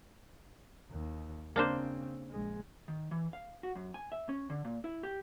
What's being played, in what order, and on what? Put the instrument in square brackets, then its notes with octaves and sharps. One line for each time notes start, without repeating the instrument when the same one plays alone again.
[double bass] D#2
[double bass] C#3 C4 [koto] A#3 D4 C5
[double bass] A#1 G#3
[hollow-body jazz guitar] D#3
E3
F5
F#4
F#2
G#5
E5
C#4
D3
A#2
E4
G4